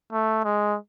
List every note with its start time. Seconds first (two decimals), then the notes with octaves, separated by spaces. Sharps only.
0.12 A3
0.44 G#3